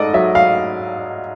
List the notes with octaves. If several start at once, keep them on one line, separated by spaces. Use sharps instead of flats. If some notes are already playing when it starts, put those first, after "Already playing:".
Already playing: G#2 A4 D5 D#5
F#3 E5
F5